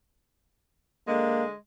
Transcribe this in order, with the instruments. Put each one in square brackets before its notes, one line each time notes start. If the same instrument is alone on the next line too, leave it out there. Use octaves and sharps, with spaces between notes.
[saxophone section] D3 G#3 [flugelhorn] A#3